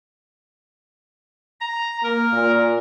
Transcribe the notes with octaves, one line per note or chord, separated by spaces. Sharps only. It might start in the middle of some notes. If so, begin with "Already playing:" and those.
A#5
A#3 A#4
A#2